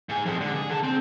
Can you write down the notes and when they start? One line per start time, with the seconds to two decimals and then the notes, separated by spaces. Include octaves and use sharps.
0.09 G#2 G#4
0.26 F2 G#3
0.41 D3
0.54 G#4
0.70 D3 A5
0.83 C4